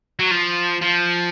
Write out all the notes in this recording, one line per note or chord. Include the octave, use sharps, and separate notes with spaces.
F#3
F3
F3